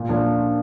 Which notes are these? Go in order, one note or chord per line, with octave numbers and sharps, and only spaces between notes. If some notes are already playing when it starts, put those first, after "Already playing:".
Already playing: A#2
F3 A#3 D4